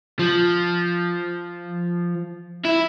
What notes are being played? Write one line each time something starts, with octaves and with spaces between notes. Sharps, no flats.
F3
E4